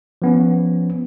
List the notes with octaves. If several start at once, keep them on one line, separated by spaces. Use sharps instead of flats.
F3 B3 C#4